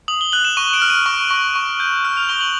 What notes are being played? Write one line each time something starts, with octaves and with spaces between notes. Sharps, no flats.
D#6 F#7
G7
F#6 F#7
E7
C#6 D#7
D7
F6
D#7
C#6
C#6
C#6
G6
F6
F7
C#6 G7
F#7